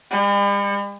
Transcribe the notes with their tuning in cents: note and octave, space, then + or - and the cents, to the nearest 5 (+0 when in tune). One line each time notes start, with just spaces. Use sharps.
G3 +45